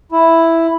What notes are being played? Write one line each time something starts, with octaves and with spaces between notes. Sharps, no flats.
E4